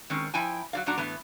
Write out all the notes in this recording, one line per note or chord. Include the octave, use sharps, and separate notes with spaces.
D#3 G#3 C4 C#4
F3 E4 G5 G#5
F#3 D5 F5
A#2 F#3 D4 F#4 A#5
A2 E3 B3